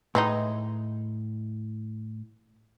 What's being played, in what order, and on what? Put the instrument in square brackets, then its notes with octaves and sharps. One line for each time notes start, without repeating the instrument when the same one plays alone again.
[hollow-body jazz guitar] A2 [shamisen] E3 G#3 D#4